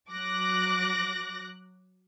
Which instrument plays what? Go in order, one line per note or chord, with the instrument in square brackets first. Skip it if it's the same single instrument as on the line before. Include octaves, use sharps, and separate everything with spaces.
[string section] F#3 D6 F#6 A#6